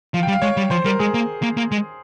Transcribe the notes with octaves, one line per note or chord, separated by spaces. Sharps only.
F3 F5
G5
G3
F5
G#3 C#5
G3
F3 C5
G3 A#4
G#3 G#4
A#3
A#3
A#3
G#3